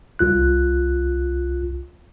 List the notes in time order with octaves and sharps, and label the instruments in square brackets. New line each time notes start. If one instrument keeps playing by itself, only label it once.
[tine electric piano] C2 F4 F#6